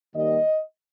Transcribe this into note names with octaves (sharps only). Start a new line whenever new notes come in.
D#2 D#3 G3 D#5